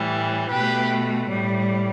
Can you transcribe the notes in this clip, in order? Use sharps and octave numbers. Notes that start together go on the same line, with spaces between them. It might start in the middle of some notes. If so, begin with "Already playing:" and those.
Already playing: A2 E3 G3
B2 A3 G4 B4
A2 G3